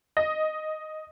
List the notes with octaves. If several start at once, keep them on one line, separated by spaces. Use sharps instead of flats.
D#5